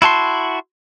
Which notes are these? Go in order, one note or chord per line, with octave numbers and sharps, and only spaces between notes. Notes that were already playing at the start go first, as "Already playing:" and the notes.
E4 F#4 A5 C6